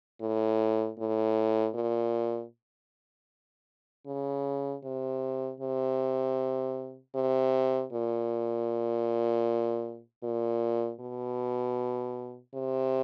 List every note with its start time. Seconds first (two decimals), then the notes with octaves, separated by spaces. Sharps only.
0.21 A2
0.99 A2
1.75 A#2
4.07 C#3
4.84 C3
5.60 C3
7.15 C3
7.93 A#2
10.23 A#2
11.00 B2
12.54 C3